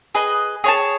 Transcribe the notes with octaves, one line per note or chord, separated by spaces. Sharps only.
G#4 B4 D#5
G#4 C#5 F#5 A5